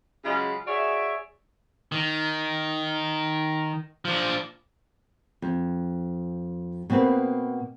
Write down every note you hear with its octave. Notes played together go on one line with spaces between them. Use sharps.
C#3 F#3 G#3 F4 B5
F#4 G#4 C#5 D5 E5
D#3
F3 D4
F2
B2 A#3 C4 B4